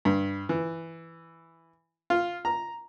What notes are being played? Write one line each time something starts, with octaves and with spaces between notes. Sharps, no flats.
G2
E3
F4
A#5